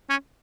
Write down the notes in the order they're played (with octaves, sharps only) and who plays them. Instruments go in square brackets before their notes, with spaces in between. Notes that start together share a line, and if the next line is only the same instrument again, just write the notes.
[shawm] C#4